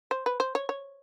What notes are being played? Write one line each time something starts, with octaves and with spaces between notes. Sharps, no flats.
C5
B4
C5
C#5
C#5